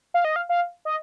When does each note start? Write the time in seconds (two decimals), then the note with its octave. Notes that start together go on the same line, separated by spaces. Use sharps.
0.14 F5
0.25 D#5
0.36 F5
0.49 F5
0.85 D#5